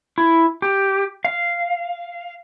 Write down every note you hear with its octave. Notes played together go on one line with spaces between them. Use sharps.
E4
G4
F5